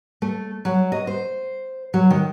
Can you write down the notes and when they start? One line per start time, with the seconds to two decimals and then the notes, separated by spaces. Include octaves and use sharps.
0.22 A3
0.65 F#3
0.92 D#5
1.07 C5
1.94 F#3
2.10 D#3